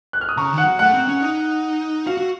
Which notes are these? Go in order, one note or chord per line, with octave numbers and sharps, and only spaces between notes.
F#6
F6
D#6
C#3 A#5 C#6
D#3
F#5
F#3
A3 F#5
C4
C#4
D#4
F#4 F5
F#4